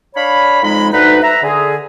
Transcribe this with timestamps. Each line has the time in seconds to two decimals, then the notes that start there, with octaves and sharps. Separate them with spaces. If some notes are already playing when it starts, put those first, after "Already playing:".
0.16 D4 C#5 F5 B5
0.63 F2 G#3 D#4 B5
0.92 D2 D#4 B4
1.22 E5 A#5
1.42 D3 G#4